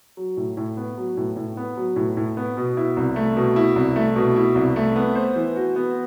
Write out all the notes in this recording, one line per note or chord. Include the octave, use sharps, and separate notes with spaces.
F#3
A2
A2
B3
F#3
A2
A2
B3
F#3
A2
A2
B3
B2
E4
C2
A3
B2
E4
C2
A3
B2
E4
C2
A3
B3
C5
E3
F#4
B3